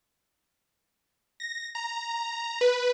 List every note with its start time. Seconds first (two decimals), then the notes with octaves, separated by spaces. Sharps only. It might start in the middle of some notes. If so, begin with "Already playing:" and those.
1.40 A#6
1.75 A#5
2.61 B4